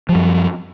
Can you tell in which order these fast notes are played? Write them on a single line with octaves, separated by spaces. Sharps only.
F3 G3 F#2